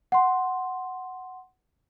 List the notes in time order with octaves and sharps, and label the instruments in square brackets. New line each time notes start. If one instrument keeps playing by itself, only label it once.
[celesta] F#5 C6